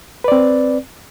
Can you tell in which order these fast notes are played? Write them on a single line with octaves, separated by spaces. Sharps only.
B4 D5 C4